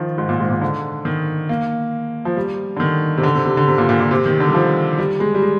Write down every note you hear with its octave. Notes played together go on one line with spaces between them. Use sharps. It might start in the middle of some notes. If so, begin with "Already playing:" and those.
Already playing: D#3 F3
G#2
A#2
G#2
A#2
D3
D#3
A#3
F3
G3
D3
D#3
C3
D3
C3
C3
D3
C3
A#2
A#2
A#2
C3
D#3
D3
G3
F3
G3
G#3
G3
G#3